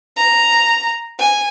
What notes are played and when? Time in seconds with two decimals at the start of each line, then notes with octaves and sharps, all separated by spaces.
0.17 A#5
1.19 G#5